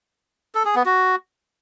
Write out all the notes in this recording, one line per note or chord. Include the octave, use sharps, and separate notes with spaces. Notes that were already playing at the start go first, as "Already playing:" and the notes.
A4
G#4
B3
F#4